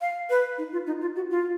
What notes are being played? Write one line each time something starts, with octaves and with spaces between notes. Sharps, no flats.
F5
B4
D#4
F4
D#4
F4
F#4
F4